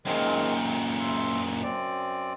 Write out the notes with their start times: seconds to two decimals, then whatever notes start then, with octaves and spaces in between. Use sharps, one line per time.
0.05 F#2 A#2 D#3 G#3 C4
0.56 G5
0.99 E5 C6
1.63 F#2 C4 D5